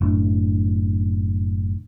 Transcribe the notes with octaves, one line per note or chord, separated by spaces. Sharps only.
F#1 A2 D4